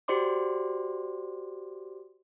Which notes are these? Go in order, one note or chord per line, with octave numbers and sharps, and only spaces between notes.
F#4 G4 C5 D5 C6 D6